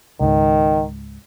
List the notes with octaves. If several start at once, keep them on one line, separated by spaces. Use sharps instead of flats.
C#2 G#2 D#3